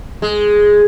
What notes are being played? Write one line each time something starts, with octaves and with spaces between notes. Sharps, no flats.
G#3